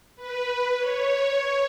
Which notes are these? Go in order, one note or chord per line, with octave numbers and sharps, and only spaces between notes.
B4
C#5